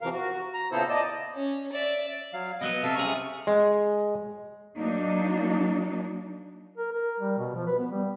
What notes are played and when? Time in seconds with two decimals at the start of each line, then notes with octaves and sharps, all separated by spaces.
0.01 F2 C3 E3 F3 A#4 F5
0.14 F#4
0.54 A#5
0.72 A#2 C#3 B3 E4 A4 C5
0.89 D5 D#5 A5
1.35 C#4
1.72 D5 E5
2.33 F#3 F5
2.61 B2 F#3 B3 D#5
2.83 C3 A4 E5 F5
2.95 C2 C3 C#4 G#4 C#6 F6
3.47 G#3
4.77 F#3 A#3 D4 D#4
6.78 A#4
6.93 A#4
7.20 G3
7.37 B2
7.55 F3
7.67 B4
7.79 B3
7.91 G3